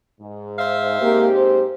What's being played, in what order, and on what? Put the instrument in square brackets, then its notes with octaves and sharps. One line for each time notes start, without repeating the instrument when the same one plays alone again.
[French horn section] G#2
[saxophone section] C5 E5 F5
[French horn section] G#2 C4 G4 [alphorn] A#3
[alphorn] C5